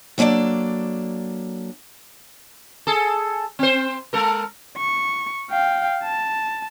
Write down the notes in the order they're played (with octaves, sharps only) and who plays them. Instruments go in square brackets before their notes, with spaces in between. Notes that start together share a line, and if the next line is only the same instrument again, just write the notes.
[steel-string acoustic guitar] F#3 A#3 D4 A4 D5
[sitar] G#4 A4
C4 C5
G#3 A4 A#4
[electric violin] C#6
F5 G5
A5